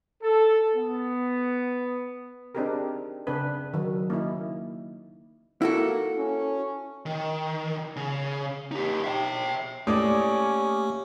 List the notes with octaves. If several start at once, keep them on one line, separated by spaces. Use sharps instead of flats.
A4
B3
C4 D4 D#4 G4 G#4 A#4
C#3 C4 D4 B4
D#3 F#3
A#3 C#4 D#4 E4
A#3 E4 F#4 A4
C#4
D#3
C#3
D#4 G4
E5 G5
A2 A3 A#3 C#4 G4 D5 D6 D#6